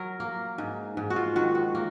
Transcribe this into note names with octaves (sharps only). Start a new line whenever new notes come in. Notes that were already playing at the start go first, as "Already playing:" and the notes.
Already playing: F#3 A#4 C#5
A#3
G#2
G#2
F#4
F4
D#3 F#4
F#4
A#3